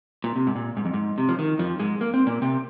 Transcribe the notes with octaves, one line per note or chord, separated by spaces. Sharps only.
A#2
C3
G#2
A#2
G#2
F2
G#2
C3
F3
D#3
F2 F3
G#2 G#3
A#3
C4
A#2 A#3
C3 C4